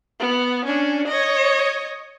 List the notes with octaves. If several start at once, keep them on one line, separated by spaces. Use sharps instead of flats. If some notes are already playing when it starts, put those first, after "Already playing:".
B3
C#4 D4
C#5 D#5